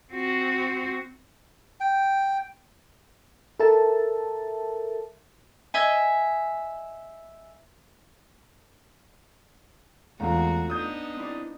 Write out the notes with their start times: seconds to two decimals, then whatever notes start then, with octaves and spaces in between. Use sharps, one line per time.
0.13 C4 F#4
1.80 G5
3.60 A4 A#4 E5 A5
5.74 D#5 E5 G#5
10.20 E2 G#3 A3 C4 F4 F#4 F5 A#5
10.70 B3 D4 D#4 D#6 G6
11.17 C4 E4 D5